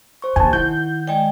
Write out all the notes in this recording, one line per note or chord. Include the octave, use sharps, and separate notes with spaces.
C5 C#6
D#2 D3 G#5 A5
D#3 E4 F#5 G6
G#3 D5 D#5 G5 G#5